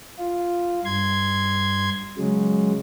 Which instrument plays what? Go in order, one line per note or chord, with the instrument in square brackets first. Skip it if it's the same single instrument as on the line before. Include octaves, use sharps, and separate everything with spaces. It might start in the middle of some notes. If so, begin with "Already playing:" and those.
[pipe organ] F4
G2 C6 G#6
C#3 F#3 G#3